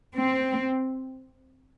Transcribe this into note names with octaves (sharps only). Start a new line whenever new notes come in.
C4